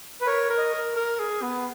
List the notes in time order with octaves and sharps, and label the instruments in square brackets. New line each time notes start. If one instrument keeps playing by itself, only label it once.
[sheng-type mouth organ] B4
[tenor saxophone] A#4 [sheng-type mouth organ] C#5
[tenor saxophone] A#4
[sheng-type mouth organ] D#5
[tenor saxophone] A#4
A#4
G#4
B3